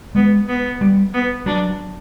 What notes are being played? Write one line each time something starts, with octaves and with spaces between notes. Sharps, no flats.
G#3 B3
B3
G3
B3
F#3 D4